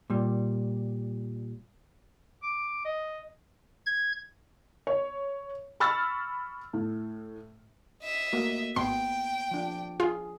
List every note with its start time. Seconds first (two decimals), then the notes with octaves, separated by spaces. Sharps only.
0.10 A#2 G3
2.43 D6
2.85 D#5
3.86 G#6
4.87 C#5
5.80 B5 C#6 E6 F6 A6
6.73 A2
8.03 D#5 E5
8.33 A3 A#3 F#4
8.76 G#1 B3 G5 C6
9.51 F3 D4
10.00 F4 G#4